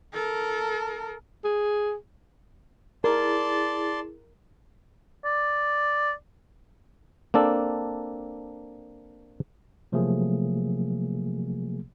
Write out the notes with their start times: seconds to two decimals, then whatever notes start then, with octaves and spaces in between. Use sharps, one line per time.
0.13 A4 A#4
1.44 G#4
3.04 E4 G#4 A#4 D5 A5 C6
5.25 D5
7.34 A#3 C4 D4 A4
9.92 C3 F3 F#3 A3 A#3 G#4